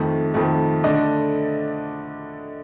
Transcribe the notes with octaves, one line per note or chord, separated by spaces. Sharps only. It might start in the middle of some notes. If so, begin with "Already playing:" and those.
Already playing: F2 D#3 A3
F2 D#3 A3
D3 A3 D4 D#5